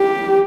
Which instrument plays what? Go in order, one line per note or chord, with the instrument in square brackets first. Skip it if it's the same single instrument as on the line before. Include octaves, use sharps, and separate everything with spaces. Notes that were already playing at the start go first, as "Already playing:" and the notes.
Already playing: [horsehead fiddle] G4